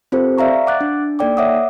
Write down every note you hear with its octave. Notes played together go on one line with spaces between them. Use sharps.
C4 F4 G4 A4 A#4 C5
D5 E5 F5 A#5 C#6
F#5 D6 F#6 A6
D4
A#3 D#4 A4 D5 G5 D6
C#5 E5 F#5 D6 D#6